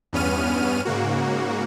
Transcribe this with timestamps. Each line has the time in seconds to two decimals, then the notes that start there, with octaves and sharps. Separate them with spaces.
0.13 E2 G2 B3 C#4 F6 D#7
0.85 G#2 C#3 A#3 F#4